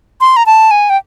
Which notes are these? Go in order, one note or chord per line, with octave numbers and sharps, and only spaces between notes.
C6
A#5
A5
G#5
G5